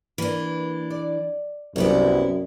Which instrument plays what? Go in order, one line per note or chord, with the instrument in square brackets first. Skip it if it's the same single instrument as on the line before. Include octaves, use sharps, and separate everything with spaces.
[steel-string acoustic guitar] E3 D4 [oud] A#3
[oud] D5
[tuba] C2 [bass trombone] F#2 [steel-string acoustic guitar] F#3 B3 E4 [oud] D5